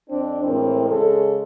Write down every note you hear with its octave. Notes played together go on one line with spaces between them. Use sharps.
F2 C4 D4
A2 E3 G#3 C4 A#4
C#3 G#3 A4